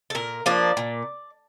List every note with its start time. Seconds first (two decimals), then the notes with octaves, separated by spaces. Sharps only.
0.10 A4
0.15 A#2 A#4
0.46 F3 A#3 D4 D5
0.77 A#2